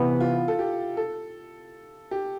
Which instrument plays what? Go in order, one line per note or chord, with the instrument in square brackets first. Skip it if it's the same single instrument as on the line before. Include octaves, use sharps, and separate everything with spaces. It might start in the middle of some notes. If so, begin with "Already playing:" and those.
Already playing: [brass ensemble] C3 E3 B3 [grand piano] E4
[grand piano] F4
A4
G4
A4
G4